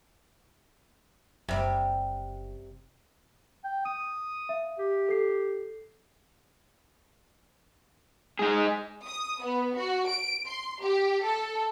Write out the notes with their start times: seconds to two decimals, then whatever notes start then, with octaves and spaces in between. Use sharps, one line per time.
1.48 F#1 C3 G3
3.64 G5
3.86 D#6 D#7
4.49 E5 F5
4.79 G4
5.09 A4 C7
8.39 G#3 D#4 G#4
9.07 D#6
9.45 B3
9.78 F#4
10.09 D7
10.48 C6
10.83 G4
11.24 A4